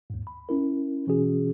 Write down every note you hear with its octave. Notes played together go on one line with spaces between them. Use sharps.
D#2 G#2
B5
C#4 E4 A#4
B2 E3 C#4 F#4 G#4